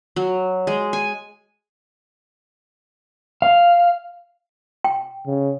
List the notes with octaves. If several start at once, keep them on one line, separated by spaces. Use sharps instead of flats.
F#3
G#3
G#5
F5
G5
C#3